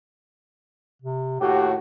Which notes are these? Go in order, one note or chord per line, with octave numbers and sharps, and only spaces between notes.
C3
D#2 A2 F#4 G4